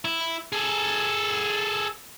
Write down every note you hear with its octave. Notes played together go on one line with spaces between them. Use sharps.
E4
G#4 A4